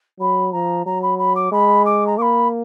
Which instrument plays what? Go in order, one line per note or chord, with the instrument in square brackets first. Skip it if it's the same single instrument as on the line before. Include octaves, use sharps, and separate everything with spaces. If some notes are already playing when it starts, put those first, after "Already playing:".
[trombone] F#3 [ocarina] B5
[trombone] F3 [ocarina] A#5
[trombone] F#3 [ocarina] A#5
[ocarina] B5
B5
D6
[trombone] G#3 [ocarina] B5
[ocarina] D6
A#5
[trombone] A#3 [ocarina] B5 D6